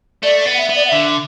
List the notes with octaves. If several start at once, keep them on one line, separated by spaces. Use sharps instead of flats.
A3 D5
B3
F#5
E5
B3
D5
F#5
D3 E5